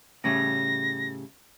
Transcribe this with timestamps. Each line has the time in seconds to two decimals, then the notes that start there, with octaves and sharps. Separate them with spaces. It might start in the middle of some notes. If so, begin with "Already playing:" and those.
0.24 A2 C#3 G3 A#6